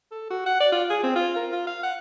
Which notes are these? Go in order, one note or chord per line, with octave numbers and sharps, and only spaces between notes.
A4
F#4
F#5
D5
F4
G#4
C4
F4
A#4
F4
F5
F#5